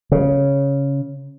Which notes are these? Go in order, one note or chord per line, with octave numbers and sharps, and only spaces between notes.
C#3